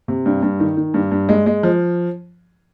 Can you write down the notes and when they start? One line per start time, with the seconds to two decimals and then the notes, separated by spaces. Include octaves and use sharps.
0.08 C3
0.26 G2
0.43 G2
0.60 D#3
0.77 D#3
0.94 G2
1.11 G2
1.29 G#3
1.46 G#3
1.63 F3